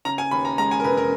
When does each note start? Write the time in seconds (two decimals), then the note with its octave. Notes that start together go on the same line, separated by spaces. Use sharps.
0.05 C#3 A#5
0.18 G#5
0.31 D#2 B5
0.45 A#5
0.58 G#3 A#5
0.71 G#5
0.80 A#4
0.84 E1 B4
0.97 A#4